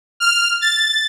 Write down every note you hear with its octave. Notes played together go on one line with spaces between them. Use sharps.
F6
A6